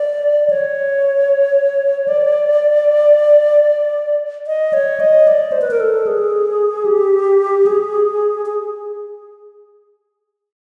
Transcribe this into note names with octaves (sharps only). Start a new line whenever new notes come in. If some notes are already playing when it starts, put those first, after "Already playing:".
Already playing: D5
C#5
D5
D#5
C#5
D#5
D5
C5
B4
A#4
A4
G#4
G4
G#4
G#4